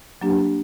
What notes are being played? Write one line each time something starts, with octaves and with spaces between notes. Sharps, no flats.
F#3 A#3 D4 G4